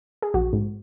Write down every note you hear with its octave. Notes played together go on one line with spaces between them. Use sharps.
G#4
A#1 F#4
G#2